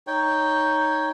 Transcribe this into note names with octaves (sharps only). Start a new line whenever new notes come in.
D#4 C#5 G5